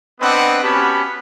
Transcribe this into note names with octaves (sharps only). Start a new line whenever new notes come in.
B3 C4 D4 B4 D#5 F#5
B3 C#4 F#4 G4 A5 B5